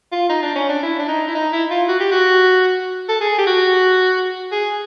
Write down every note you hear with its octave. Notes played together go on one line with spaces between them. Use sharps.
F4
D#4
D4
C#4
D4
E4
D4
D#4
E4
D#4
E4
F4
F#4
G4
F#4
A4
G#4
G4
F#4
G#4